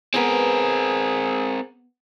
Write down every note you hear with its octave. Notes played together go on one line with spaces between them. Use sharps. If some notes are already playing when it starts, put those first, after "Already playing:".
B3 C4 G#4 A#4 B4 G#5